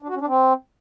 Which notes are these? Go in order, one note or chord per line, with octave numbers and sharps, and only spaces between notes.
D4
F#4
C#4
D4
C4